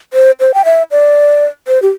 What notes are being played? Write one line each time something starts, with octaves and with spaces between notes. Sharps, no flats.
C5
C5
G5
E5
D5
C5
G4